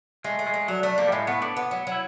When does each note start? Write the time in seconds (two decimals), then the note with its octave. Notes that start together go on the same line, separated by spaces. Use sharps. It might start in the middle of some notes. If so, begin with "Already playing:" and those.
0.24 G#3 A3
0.39 A3
0.47 G#3
0.54 A3
0.68 F#3 D4
0.83 A3 D4
0.98 F3 A#3
1.07 G3
1.12 A2 G#3
1.27 A3 B3
1.42 A2 D4
1.56 B3
1.71 F#3
1.87 F#3 E4